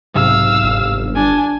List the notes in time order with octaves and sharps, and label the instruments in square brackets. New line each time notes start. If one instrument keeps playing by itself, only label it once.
[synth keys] B1 G#2 C3 [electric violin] F5 E6
[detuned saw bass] G1
[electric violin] D4 G#5